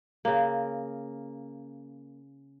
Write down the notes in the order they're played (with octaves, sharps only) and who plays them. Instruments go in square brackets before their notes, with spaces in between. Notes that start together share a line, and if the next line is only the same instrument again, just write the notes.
[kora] C#3 A#3